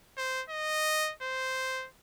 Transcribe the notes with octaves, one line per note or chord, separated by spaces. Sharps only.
C5
D#5
C5